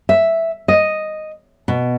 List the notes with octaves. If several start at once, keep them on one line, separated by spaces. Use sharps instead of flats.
E5
D#5
B2